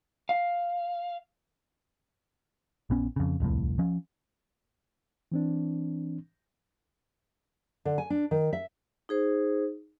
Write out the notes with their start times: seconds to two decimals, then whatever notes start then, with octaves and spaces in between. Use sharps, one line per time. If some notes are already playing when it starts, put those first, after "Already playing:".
0.29 F5
2.90 A#1 B3 C#4
3.16 F2 C#3
3.40 D1 C2 F2 A2
3.79 F3 C#4
5.32 E3 C4 D4
7.85 D3
7.98 G#5
8.10 D4
8.31 D#3
8.53 E5
9.09 D#4 G#4 C5